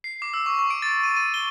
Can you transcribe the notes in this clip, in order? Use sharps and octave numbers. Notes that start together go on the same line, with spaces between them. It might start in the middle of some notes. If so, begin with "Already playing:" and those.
C7
D6
E6
C#6
C#6
D7
A6
D#7
D#7
G7